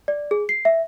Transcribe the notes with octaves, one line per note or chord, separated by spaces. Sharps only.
D5
G#4
C7
E5